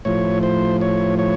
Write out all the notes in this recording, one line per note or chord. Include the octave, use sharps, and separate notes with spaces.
A2 F3 C#5
C5
C#5
C#5